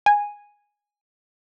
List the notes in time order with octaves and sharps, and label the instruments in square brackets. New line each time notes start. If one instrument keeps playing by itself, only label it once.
[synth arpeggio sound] G#5